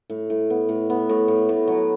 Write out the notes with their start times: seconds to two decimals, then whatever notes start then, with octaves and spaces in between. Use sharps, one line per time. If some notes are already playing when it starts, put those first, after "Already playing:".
0.10 A2
0.30 A2
0.50 B3
0.69 A2
0.90 B3
1.09 A2
1.28 A2
1.49 A2
1.68 F#3